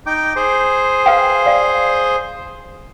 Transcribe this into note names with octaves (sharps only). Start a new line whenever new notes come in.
D#4 G5 D6
G#4 C5
B4 F5 G5
D5 F5